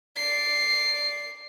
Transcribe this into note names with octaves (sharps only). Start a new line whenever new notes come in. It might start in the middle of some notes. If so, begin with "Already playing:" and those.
D5 C7